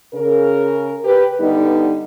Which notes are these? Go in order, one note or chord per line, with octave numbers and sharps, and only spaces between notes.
C#3 A#4
G4 B4
D3 G3 B3 D#4